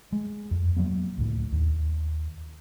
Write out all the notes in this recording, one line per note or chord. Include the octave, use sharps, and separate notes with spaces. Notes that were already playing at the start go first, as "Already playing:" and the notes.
G#3
F2
F#3 G#3 A#3 B3
C#2 A2
D#2